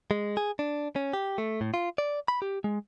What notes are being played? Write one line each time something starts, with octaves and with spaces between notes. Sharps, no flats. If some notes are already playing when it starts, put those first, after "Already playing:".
G#3
G#4
D4
C#4
G4
A3
A2
F4
D5
B5
G4
G#3